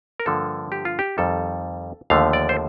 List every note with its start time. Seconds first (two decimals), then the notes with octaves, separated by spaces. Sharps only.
0.20 A#4
0.26 G2 D3 F3 A#3 A4
0.72 G4
0.85 F4
0.99 G4
1.18 F2 D#3 G3 A4
2.10 D#2 D3 F3 A3 F5
2.33 D5
2.49 C5